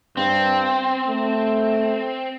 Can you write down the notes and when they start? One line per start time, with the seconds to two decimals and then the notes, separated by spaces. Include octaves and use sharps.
0.17 G2 C4
1.08 A3